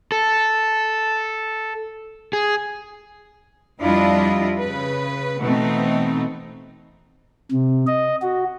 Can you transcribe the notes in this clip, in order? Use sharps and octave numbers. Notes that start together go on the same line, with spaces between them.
A4
G#4
F2 G3 D4 E4 F4 D#5
C#3 B4
B2 E3 A3 B3 C4 D#4
C3
D#5
F#4